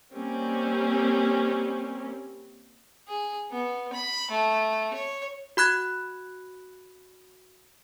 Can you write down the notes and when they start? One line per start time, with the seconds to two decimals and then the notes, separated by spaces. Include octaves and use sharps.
0.13 G3 A#3 C4 C#4
3.09 G#4
3.51 B3
3.93 B5
4.31 A3
4.94 C#5
5.57 F#4 B5 F#6 G#6